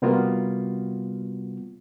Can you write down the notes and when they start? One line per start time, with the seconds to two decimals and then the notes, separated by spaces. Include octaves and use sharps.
0.02 C3 G3 A#3 B3 F4 F#4